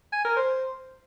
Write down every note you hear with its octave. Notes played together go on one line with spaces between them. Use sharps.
G#5
A#4
C5